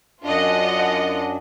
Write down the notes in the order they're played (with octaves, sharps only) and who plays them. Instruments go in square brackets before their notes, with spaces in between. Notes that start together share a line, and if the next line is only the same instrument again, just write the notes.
[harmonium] F#2 D4 [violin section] F4 D#5 F#5